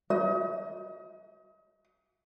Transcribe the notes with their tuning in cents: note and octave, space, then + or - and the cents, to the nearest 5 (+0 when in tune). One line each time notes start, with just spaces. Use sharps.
D#5 +35